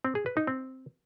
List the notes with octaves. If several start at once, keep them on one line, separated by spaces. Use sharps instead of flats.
C4
G#4
B4
D#4
C4